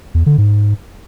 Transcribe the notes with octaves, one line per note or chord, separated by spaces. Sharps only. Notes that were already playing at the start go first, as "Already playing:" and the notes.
E2
D3
G#2